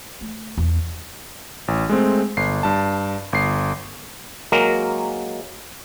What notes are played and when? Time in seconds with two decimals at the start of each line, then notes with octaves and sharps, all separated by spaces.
0.21 A3
0.58 E2
1.68 A1
1.89 G#3 A3 C4
2.37 G1 C7
2.63 G2 A5
3.33 G1 C7
4.52 F#3 G#3 A#3 A#4